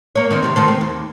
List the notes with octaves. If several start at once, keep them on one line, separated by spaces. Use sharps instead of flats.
A#3 C#5
D#3 C4 D#4
C3 G3 C4
D#3 A3 C5
C4
D#2